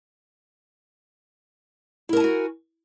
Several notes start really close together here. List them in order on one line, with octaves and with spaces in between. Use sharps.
E4 A#4 A5 G#5 F#4